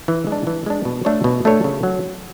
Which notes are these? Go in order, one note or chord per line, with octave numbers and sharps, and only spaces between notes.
E3
G#3
D4
E3
G#3 D4
B2
A3 D4 A4 C#5
B2
A3 D4 A4 C#5
C#3
F#3